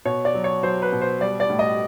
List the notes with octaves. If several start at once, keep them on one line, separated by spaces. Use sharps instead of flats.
B2 C#5
D5
F#3
C#5
F#3 C5
B4
B2
C5
G3 D5
D5
A2
D#5